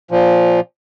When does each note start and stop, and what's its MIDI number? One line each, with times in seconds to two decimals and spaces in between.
0.11 0.60 46
0.11 0.60 53